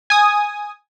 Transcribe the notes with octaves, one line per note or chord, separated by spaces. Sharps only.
G#5 D#6